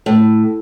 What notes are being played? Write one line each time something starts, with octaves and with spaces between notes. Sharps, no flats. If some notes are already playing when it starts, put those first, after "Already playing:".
A2